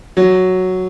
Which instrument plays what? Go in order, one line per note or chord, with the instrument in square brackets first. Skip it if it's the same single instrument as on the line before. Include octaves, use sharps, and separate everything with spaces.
[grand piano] F#3